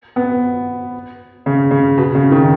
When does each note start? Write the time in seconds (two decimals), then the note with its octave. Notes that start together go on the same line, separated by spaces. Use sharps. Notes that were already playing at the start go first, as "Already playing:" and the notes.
0.16 B3
1.46 C#3
1.71 C#3
1.98 B2
2.15 C#3
2.31 D#3